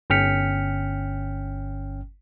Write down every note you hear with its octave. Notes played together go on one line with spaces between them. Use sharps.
G1 C#4 G5 F6 B6 C#7